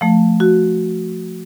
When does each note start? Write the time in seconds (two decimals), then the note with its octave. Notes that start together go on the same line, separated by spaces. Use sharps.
0.01 F3 A3
0.40 F#4